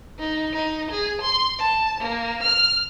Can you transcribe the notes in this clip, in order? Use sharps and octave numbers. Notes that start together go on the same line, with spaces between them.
D#4
D#4
G#4
C6
A5
A#3
F6